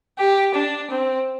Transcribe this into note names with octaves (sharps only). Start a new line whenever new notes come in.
G4
D4
C4